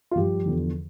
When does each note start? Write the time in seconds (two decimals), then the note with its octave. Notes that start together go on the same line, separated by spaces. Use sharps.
0.11 F4
0.16 G2 F3 G4
0.46 E2 D3 F3